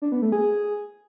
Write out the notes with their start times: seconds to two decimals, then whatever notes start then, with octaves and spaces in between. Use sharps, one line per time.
0.02 D4
0.12 B3
0.22 A3
0.32 G#4